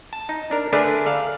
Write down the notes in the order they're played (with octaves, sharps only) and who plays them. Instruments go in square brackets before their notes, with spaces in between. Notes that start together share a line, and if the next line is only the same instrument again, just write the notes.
[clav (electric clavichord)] A5
D#4
D4 A#4
D3 A3 D4 G#4 A#4 B4
A4 D5 F5